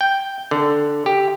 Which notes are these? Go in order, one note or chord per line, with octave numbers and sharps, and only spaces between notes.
G5
D3
G4